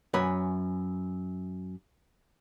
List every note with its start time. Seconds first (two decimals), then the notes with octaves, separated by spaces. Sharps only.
0.14 F#2 B4 C#5 G#5 A#5